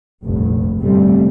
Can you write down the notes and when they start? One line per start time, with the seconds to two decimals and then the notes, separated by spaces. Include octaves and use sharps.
0.24 F1 A#1 G2
0.79 G1 F2 C3 G3 A3 C4